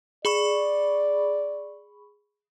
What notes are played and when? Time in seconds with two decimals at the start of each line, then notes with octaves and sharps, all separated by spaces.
0.25 G#4 D5 B5 C#6